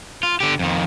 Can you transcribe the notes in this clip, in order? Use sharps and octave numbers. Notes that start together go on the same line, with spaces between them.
F4
D3 G4
F2 D#3